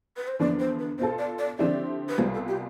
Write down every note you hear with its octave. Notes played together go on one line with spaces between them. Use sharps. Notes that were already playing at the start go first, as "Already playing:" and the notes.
B4
C5
E2 D3 F3 B3 D4 D5
C5
B4
B2 B3 F4 A4 C5
D5
D5
D3 F3 C4 E4 G4 D5
B4
C2 B2 G3 B3 F4 C5
A4
G4